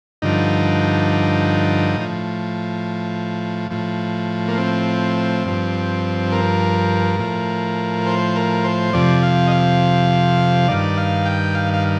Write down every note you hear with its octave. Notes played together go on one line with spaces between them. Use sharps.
G2 D3 F3 D#4
A2 F3
A2 F3
A#3
C4
G2 F3
A#4
A2 F3
C5
A#4
C5
F2 C3 F3 D5
F5
D#5
F5
G2 D#3 D5
F5
G5
F5
F5